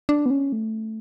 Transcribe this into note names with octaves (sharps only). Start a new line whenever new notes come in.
D4
B3
C#4
A3